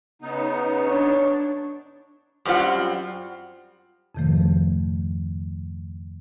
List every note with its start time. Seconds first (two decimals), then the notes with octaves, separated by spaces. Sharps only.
0.22 C#3 B3 D#4
0.87 D4 C#5
2.45 F#2 G3 C4 F4 F#5
4.15 F2 G#2 C3 D#3 F3 A3